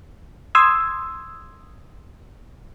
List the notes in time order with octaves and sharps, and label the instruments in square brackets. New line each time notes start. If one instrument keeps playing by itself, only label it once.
[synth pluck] C6 D#6 E6 G#6